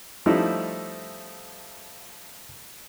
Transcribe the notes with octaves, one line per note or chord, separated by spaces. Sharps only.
F3 G3 A3 C#4 D#4 E4